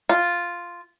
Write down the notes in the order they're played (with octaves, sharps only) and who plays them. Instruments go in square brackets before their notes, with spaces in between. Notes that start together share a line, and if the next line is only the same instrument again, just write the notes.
[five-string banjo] F4